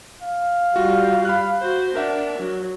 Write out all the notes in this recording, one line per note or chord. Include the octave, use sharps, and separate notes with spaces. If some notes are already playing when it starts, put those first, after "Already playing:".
F5
G3 F4 F#4
B5 F#6
F#4 C5
D4 A#4 E5 F#5
F#3